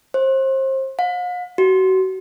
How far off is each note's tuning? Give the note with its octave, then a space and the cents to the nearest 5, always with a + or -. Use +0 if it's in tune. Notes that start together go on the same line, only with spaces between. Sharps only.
C5 +30
F5 +45
F#4 +30